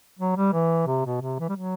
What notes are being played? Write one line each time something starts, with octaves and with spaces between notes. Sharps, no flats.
F#3
G3
E3
C3
B2
C3
E3
G3
F#3